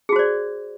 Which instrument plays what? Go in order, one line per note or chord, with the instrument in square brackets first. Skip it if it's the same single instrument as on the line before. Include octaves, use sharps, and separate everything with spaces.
[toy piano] G#4
F#4
C5
D5